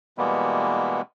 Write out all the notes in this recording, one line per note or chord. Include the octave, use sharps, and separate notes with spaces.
B2 E3 G3 G#3 A#3 B3